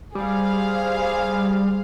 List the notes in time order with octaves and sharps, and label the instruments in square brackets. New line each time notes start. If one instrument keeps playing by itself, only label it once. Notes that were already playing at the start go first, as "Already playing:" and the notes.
[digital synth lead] G3 [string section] G#4 C5 F5